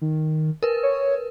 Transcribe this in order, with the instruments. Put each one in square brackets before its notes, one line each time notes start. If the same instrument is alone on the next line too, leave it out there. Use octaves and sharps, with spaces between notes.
[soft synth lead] D#3
[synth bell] A#4 B4
[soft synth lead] C#5